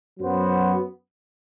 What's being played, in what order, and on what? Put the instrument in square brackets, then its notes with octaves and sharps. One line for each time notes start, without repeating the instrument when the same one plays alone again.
[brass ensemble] F#2 F#3 B3 F#4 C5